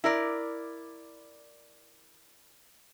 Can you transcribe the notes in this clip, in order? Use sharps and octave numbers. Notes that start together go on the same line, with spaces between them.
E4 A#4 D5